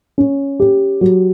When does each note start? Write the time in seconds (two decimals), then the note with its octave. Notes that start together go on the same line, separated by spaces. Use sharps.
0.18 C#4
0.60 G4
1.01 F#3